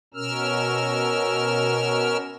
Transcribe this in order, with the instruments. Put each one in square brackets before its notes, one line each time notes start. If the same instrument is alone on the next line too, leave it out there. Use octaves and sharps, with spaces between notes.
[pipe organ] B2 C#4 A#4 E6 F6